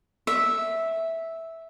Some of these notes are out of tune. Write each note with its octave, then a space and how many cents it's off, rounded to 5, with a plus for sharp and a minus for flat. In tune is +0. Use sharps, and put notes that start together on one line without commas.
E5 -10